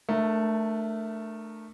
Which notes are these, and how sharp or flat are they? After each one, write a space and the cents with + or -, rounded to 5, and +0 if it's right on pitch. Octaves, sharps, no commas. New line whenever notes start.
A3 +0 D4 +30 A#4 +0